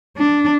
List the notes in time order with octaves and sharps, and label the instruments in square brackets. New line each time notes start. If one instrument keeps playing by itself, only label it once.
[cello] D4